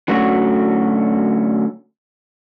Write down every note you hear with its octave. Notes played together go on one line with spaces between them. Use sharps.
D3 F#3 A3 C#4 F#4